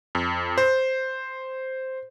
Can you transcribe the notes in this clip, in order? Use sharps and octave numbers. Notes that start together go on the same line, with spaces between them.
F2
C5